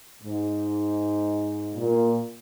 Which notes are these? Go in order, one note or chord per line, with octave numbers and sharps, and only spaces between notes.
G#2
A#2